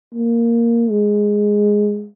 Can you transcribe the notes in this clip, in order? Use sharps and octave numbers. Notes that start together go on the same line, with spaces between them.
A#3
G#3